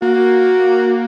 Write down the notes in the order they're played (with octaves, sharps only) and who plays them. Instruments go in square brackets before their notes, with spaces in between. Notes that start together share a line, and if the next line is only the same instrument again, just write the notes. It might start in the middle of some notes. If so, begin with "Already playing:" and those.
[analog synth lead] A#3 [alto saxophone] F#4